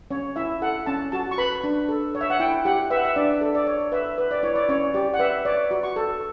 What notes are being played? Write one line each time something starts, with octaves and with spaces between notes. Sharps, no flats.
C#4 C#5
E4 E5
A4 F#5
C#4 A5
F#4 A5
C#6
B4 B5
D4
A4
C#5
E5
F#5
E4 G5
G4 F#5
B4 E5
F#5
E5
D4 D5
A4
D5
C#5
B4 E5
B4
D5
E4 C#5
D5
C#4 C#5
G4 D5
F#5
B4 E5
C#5 D5
F#4
C#6
A4